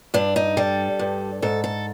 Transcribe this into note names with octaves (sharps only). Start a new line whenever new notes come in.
G2 D4
D#4
G3 A4
G2
G#2 A4
A4